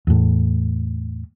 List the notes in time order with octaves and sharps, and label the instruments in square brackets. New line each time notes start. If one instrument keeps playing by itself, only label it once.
[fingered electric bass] E2 A2